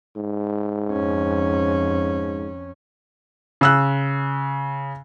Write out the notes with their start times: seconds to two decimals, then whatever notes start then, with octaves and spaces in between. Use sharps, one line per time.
0.17 G#2
0.92 F2 C#4
3.61 C#3 E6 F#6